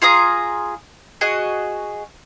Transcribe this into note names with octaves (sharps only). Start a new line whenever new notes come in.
F4 G#4 A#5 D#6
F#4 G#4 D#5